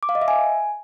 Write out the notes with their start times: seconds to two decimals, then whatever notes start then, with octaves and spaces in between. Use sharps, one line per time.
0.03 D6
0.09 F5
0.15 D#5
0.22 E5
0.28 G#5